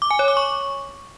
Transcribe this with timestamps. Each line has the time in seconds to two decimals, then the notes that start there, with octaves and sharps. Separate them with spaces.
0.02 D6
0.11 G#5
0.19 C#5
0.28 D6
0.37 C#6